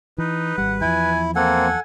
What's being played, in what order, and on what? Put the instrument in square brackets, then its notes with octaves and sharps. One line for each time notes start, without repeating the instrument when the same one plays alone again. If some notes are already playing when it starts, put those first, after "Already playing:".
[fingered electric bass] E3 [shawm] D#4 [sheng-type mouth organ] B4
[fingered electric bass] G#1 G3 [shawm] F#5
[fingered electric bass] E2 F3 [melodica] E4 [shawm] G#5
[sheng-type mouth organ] A#3 C4 [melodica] A4 F#5 [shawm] G#5